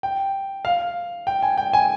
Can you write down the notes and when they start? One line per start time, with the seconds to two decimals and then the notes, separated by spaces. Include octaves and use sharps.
0.03 G5
0.65 F5
1.27 G5
1.43 G#5
1.57 G5
1.73 G#5